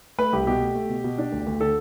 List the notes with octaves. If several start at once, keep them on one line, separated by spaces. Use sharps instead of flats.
A3 B4
C2 G4
B2 G4
A3
A3
B2
B2
D4
D2
D2
D3 A4